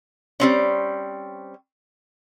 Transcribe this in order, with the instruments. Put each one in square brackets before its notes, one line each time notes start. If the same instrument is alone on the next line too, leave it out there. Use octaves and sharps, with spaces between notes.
[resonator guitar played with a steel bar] G3 C4 C#4